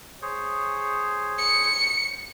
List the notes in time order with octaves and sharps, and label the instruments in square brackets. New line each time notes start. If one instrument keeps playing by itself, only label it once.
[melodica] G#4 C5 C#5
[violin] C#7